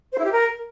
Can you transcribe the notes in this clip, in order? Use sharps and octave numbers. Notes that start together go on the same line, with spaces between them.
C5
E4
G4
A#4